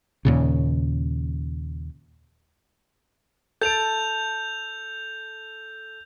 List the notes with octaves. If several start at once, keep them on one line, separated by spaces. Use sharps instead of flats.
D#2 A#2 C#3
A4 A5 G6 D7 F7